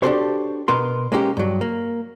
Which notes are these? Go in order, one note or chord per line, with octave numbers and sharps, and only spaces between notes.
D4 F#4 G4 A4 C5 C#5
B2 B3 A#4 C6
G#3 A#3 C#4 G4
G2 F#3
A#3